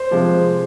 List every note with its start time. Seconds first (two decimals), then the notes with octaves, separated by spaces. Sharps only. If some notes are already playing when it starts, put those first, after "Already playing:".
Already playing: C5
0.11 C3 F3 G#3